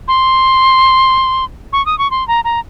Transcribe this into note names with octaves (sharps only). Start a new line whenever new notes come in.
C6
C#6
D#6
C#6
C6
A#5
A#5